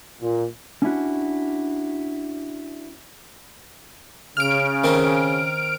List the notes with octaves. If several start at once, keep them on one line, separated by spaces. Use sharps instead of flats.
A#2
C#4 D4 E4 F#4
C#3 F6 D7
D#3 C4 A#4